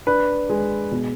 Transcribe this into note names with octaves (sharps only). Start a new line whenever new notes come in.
D4 B4
G#3
B2